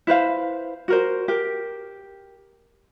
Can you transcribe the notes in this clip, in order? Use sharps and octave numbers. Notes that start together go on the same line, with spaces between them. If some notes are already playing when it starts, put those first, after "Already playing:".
E4 B4 C5 F5
F#4 A#4 C5
G4 A#4